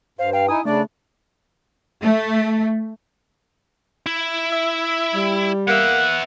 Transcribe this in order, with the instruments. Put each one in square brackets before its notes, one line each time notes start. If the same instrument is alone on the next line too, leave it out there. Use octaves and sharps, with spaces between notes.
[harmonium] G2 [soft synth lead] C5 [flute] F5
[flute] F5 [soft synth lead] G5
[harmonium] D#4 E4 [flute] G#5 [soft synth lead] D#6
[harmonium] C#3 D4 [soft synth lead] A3 [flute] D5
[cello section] A3
[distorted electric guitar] E4
[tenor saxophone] E5
[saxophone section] G3
[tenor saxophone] A#3 [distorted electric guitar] B3 E5 [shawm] F#5